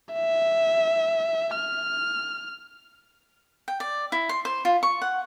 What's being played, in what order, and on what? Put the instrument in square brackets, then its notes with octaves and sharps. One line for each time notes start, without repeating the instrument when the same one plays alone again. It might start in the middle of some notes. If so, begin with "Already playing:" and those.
[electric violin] E5
F6
[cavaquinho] G5
D5
E4
C6
C5
F4
C#6
F#5